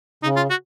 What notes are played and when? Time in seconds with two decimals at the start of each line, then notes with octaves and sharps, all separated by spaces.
0.23 C#3 D#4
0.36 F4
0.50 F#4